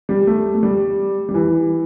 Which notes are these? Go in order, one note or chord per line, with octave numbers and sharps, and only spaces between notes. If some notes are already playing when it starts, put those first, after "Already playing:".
G3
A3
A3
G3
G3
E3